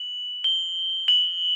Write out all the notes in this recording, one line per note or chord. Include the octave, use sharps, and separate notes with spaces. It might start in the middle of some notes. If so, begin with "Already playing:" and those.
Already playing: F#7
G7
F#7